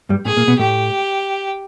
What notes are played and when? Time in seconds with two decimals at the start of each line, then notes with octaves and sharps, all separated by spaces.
0.09 G2 G3
0.25 A2 A3 G#4
0.37 A#2 A#3
0.47 B2 B3
0.59 A2 A3 G4